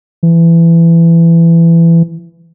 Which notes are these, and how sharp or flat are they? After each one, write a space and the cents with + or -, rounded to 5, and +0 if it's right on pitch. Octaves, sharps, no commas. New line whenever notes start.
E3 +20